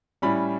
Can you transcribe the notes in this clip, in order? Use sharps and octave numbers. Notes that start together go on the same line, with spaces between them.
A2 G3 C#4 B5